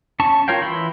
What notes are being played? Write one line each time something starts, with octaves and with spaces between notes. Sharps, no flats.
C#4 A5 C#6
F4 A#4 C#5 F5 G5
E3 E4 B5 C6